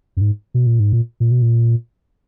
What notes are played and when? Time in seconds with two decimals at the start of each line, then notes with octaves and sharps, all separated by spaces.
0.17 F#2
0.21 G#2
0.54 B2
0.67 A#2
0.80 G#2
0.93 A#2
1.20 A#2
1.31 B2
1.42 A#2